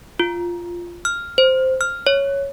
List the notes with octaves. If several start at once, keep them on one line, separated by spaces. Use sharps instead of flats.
F4
F6
C5
F6
C#5